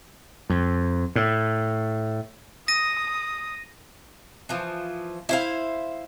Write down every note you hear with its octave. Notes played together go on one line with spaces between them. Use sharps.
F2
A2
D#6 A#6 D#7
E3 F3
E4 C5 F5